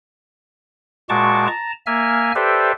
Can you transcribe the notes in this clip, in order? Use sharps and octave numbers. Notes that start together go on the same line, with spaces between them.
A#2 G#3 F#4 A5 C#6 D6
A5 A#5
A#3 E5 G#5 F6
G4 A4 B4 C5 D5 E5